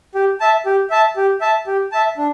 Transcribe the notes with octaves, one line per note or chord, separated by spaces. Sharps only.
G4
E5 A5
G4
E5 A5
G4
E5 A5
G4
E5 A5
D4